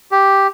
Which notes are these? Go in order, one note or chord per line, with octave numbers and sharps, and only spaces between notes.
G4